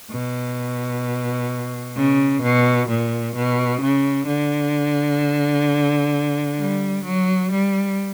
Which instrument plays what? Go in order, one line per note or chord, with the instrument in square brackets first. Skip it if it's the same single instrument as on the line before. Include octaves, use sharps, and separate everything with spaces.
[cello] B2
C#3
B2
A#2
B2
C#3
D3
G3
F#3
G3